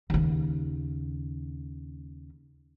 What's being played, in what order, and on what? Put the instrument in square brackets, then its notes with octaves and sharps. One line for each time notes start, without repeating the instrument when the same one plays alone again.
[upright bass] D#2 C#3